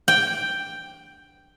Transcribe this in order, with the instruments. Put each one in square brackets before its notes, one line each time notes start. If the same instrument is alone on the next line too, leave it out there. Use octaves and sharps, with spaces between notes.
[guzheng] G5